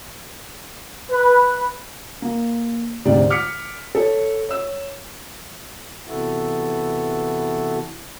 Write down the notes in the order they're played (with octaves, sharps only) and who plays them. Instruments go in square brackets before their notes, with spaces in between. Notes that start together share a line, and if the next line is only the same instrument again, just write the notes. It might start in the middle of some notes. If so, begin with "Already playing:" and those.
[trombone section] B4
[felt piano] A#3
D2 G#2 C3 G4 D5
D6 F6 B6 C#7
A4 C#5
C#5 E6
[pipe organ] C3 E3 B3 E4 F#4 A4